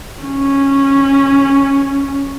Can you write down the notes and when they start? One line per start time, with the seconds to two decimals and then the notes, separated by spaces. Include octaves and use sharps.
0.21 C#4